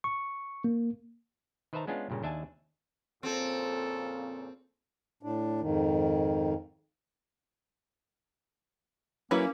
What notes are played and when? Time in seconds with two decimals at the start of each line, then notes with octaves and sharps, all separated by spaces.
0.04 C#6
0.64 A#3
1.73 D#3 B4 C5 E5 A5 A#5
1.87 G#3 B3 C#4 D4 F4
2.10 G2 A#2 C#3
2.23 D#2 D4 E5 G#5 A5
3.23 F2 A#2 C#3 C4 A4
5.23 A2 D4
5.61 F2 G#2 D#3
9.31 F#3 A#3 C#4 E4 B4